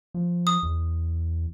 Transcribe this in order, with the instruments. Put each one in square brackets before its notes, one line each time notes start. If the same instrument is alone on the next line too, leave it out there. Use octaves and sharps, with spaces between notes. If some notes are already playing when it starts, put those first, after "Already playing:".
[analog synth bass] F3
[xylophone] D#6
[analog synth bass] E2